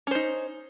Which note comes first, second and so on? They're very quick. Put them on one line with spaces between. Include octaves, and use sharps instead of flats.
C#4 C5 D#4